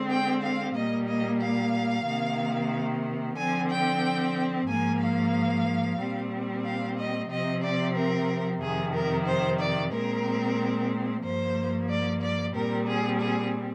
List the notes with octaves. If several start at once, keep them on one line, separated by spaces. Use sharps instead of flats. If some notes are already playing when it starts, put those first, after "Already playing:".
Already playing: D3 G#3 C4
G5
F5
A#2 G3 A#3 D#5
D#5
F5
C3 D#3 A#3
D3 F3 C4 G#5
G5
G#2 F3 A#3 G#5
F5
A#2 G3 C4
F5
D#5
C3 F3 C4 D#5
D5
A#4
F2 C3 D#3 G#4
A#4
C5
D5
A#2 G#3 C4 A#4
G2 F3 A#3 C5
D5
D5
A#2 G3 C4 A#4
G#4
G#4